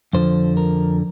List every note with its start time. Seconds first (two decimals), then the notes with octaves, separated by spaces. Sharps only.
0.13 F2 D3 F3 C5
0.57 A#4